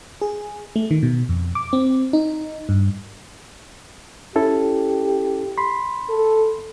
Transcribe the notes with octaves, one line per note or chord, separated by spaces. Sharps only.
G#4
A3
D#3
B2
F2
D6
C4
D#4
G2
C#4 E4 G4 A4
B5 C6
A4